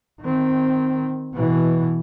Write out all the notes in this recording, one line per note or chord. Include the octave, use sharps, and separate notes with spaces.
D#3 C4
B2 E3